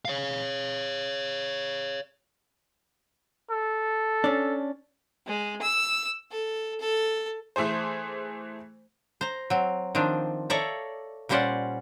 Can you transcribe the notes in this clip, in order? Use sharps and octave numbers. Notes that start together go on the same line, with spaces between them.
C#5 F5
A4
C#4 D4
G#3
E6
A4
A4
E3 A3 G#4 C5
C5 A#5
F#3 C4
D#3 F3 C4 D4
A4 C#5 D5 E5 F5 A#5
A#2 G3 C#4 C5 D5 F#5